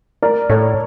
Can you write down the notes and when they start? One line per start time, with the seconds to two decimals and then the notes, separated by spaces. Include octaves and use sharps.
0.22 A#4 D5
0.49 A2 A4 C#5